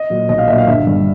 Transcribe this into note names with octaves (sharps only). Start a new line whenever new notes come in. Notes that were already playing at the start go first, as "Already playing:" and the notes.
Already playing: D#5
A#2 F#3
B1 D#5
F5
A#2 F#3 E5
F5
G1 E5
G2 D3